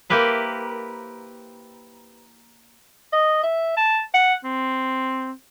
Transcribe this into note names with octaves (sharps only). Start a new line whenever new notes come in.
A#3 E4 G4 B4 C5
D#5
E5
A5
F#5
C4